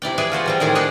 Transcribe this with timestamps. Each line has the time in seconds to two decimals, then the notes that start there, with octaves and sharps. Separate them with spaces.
0.02 C3 E4 D5 G5
0.18 G#4 B4 D5 E5
0.32 F4 F#4 C5 D5
0.46 C3 G3 C4
0.60 A2 D#3 E4 G#4 D5 G#5
0.75 D4 D#4 G#4 A4 B4